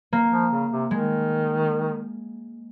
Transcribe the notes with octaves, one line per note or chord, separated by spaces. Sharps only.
A#3
F3
C#3
C3
D#3 G#3